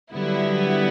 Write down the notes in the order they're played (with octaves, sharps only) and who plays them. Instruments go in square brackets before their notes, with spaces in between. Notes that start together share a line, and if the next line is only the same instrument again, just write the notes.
[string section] D3 F#3 B3 E4 [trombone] G3